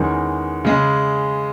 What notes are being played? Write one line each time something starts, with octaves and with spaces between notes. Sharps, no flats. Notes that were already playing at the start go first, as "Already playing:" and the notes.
Already playing: E2 D#3 G#3 C#4
C#3 G#3